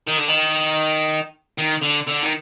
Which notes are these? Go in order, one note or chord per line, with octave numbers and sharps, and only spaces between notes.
D#3
D3
D#3
D#3
D3
D3
D#3